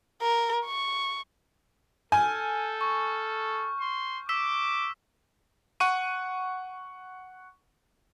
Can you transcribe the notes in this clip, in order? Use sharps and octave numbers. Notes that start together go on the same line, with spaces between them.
A#4
C#6
A4 G#5 F6 G6
C#6
C6
D6 E6 B6 E7
F#5 C#6 D#7